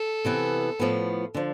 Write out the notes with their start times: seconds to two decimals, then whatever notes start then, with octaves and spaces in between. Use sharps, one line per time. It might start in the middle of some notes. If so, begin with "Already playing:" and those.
Already playing: A4
0.25 C3 E3 B3
0.80 A2 F3 B3
1.35 D3 F3